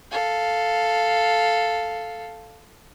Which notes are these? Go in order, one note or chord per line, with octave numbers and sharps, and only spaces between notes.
A4 F5